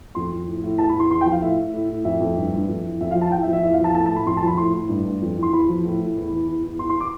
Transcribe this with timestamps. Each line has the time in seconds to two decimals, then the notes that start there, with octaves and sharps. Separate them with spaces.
0.15 F2 C6
0.32 F3
0.48 A2
0.64 A2
0.78 E2 A5
0.89 B5
0.94 E2
1.00 C6
1.10 E2 C6
1.21 G5
1.26 F3
1.32 F5
1.41 A2 E5
1.57 A2
1.74 A2
1.89 A2
2.05 F2 E5
2.20 F2
2.37 G2
2.53 G2
2.68 F2
2.85 E3
3.01 F2 E5
3.11 F3 F5
3.21 A5
3.31 E2 G5
3.42 E5
3.47 F3
3.53 E5
3.63 E2 E5
3.73 F5
3.79 F3 A5
3.95 A2 A5
4.06 A5
4.11 A2
4.16 B5
4.26 F2 C6
4.37 A5
4.42 F3
4.47 B5
4.57 A2 C6
4.74 A2
4.89 G2
5.05 G2
5.22 F2
5.36 E3
5.43 C6
5.53 E2 B5
5.69 F3
5.85 A2
6.01 A2
6.17 E2
6.32 E3
6.48 E2
6.63 E2
6.79 E2 C6
6.89 C6
7.01 D6